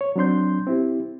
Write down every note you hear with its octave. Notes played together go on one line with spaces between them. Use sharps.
C#5
F#3 C4 D4 C6 G6
C4 E4 G4